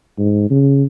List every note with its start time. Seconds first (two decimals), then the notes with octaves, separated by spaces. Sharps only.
0.18 G#2
0.50 C#3